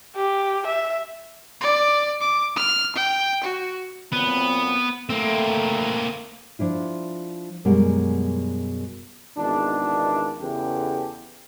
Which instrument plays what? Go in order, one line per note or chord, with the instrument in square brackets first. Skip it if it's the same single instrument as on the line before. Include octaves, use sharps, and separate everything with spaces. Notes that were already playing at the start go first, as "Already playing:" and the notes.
[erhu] G4
E5
[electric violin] D5
D6
F6
G5
F#4
[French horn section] A#2 F#3 C4 [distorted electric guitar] B3
[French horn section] A3 [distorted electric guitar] A#3 C4
[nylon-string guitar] F3 D4 E4 F4
F#2 B2 G3 G#3 F#4 A#4
[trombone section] G#1 E2 B2 D4
E2 C#3 E3 G4 A4